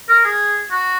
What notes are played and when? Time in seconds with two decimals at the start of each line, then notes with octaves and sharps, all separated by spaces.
0.09 A#4
0.24 G#4
0.71 F#4